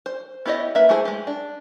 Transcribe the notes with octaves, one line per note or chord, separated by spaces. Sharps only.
C5
B3 E4 G4 C#5 D#5
A#3 B4 E5
G#3 A3 E4 G#4 C5
G#3 G4
D4